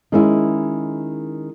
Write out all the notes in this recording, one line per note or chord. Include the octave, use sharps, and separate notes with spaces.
D#3 G#3 C#4 E4